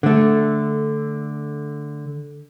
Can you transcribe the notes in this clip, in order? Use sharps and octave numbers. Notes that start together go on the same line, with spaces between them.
D3 A3